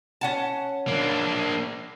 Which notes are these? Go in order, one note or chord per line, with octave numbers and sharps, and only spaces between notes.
C#4 F#5 A5
A#3 D4